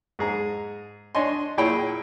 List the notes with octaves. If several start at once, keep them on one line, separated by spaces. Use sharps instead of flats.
G#2 G#4 A#5
D4 C#5 D#5 G#5 C6
A#2 E4 G#4 C#5 G5 B5